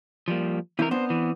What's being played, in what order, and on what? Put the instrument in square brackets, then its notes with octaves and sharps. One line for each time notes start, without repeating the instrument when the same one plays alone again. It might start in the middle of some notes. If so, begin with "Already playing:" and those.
[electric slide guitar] F3 G3 A#3
[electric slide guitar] E3 A#4 [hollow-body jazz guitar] C4 E4
[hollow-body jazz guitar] B3 C4 D4 [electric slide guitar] C5
[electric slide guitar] E3